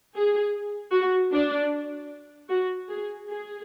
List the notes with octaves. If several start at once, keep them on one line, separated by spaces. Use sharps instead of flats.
G#4
F#4
D4
F#4
G#4
G#4